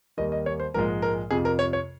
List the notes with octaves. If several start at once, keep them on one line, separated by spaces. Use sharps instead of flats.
D#2 D#3 G3 A#3 D#5
D#5
C#5
C5
A#1 G#2 F3 G#3 A#4
A#4
F2 C3 F3 G#4
A#4
C#5
C#5